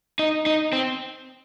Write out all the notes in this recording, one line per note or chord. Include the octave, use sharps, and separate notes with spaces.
D#4
D#4
C4